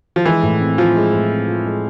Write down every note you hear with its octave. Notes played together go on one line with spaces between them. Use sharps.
F3
E3 G#3
A2
C4
F3 F4
G#3
A2
C4
F4
G#3